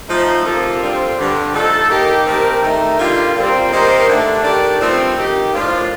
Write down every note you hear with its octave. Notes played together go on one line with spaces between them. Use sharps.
F3 A3 D#4
C3 F3 A#3 F4 A4
D3 G3 C4 F4
G2 D3 G3
F3 A3 D#4 A4
D#3 A#3 D#4 G4
D#3 A3 C4 G4 A#4
D#3 A3 D#4
D3 G3 A#3 F4
A#2 G3 C4
D#3 A#3 D#4 G4 C5
D3 A3 D4
D#3 A3 D4 G4 D5
G2 F3 A3 C4
D#3 A#3 D#4 G4
A2 F3 A#3 D4 F4